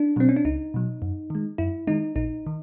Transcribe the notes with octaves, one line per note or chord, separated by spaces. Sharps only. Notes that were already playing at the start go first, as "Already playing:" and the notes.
Already playing: D4
B2 F#3 C4
C#4
D4
C#2 D#4
B2 F#3
F#2
D#3 G#3
F#2 E4
D#3 G#3 D#4
A#1 D#4
D#3